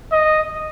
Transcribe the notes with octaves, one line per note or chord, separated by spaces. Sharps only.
D#5